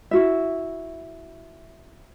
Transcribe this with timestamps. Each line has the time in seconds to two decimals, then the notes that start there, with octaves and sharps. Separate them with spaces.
0.11 E4 F#4 E5